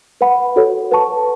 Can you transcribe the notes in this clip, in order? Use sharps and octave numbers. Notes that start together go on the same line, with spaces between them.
B4 F#5 B5
F#4 A4 C#5
B4 F#5 A5 C#6